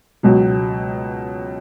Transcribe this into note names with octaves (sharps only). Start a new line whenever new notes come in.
C#2 B2 F#3